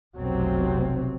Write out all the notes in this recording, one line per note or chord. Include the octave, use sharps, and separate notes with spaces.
F1 B1 C3 F#3 C4